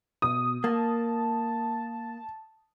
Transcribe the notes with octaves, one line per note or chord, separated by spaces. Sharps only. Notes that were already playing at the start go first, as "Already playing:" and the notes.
B2 D#6
A#3 A5